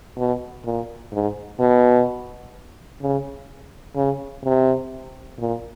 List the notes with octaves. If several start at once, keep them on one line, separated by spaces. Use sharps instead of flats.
B2
A#2
G#2
B2
C#3
C#3
C3
A#2